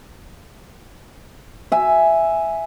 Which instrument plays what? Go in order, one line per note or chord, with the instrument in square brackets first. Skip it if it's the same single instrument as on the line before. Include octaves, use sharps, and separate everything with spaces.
[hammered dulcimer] E5 G#5